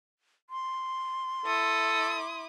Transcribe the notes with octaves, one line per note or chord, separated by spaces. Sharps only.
C6
E4 A4 D#6